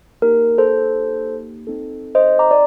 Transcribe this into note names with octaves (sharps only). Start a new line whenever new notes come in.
A#3 D#4 G4 A#4
A4 C5
C4 D#4 A4
C5 D#5
A#5 D6
D5